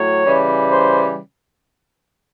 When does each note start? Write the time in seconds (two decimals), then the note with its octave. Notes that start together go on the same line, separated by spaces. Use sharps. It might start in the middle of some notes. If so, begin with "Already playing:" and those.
Already playing: A2 F#3 C#5
0.25 C#3 E3 G3
0.71 C5